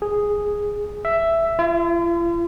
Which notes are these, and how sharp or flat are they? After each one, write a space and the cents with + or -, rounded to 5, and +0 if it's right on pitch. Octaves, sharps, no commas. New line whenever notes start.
G#4 -5
E5 +5
F4 -45